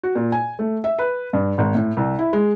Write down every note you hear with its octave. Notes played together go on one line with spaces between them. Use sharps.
F#4
A#2
G#5
A3
E5
B4
G2
G#1
A2
C2
E4
G#3